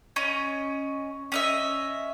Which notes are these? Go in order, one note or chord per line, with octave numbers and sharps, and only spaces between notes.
C#4 D#5
C#4 D#5 E5